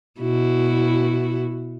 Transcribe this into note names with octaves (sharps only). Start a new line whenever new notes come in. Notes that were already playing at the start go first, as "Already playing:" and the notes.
B2 E4 F#4